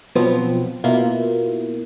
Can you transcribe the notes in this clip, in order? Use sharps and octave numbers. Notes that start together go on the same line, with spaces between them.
B2 F3 F#3 B3 C4
B2 A#3 E4 F4